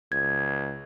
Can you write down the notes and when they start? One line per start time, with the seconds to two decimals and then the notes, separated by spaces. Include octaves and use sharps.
0.12 C#2 G#6